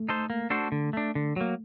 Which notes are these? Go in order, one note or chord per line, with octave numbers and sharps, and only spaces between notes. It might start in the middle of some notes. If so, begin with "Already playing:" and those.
Already playing: A3
D#4 A4 C5
A#3
D4 F#4 A4 C5
D3
A3 D4
D3
F#3 A#3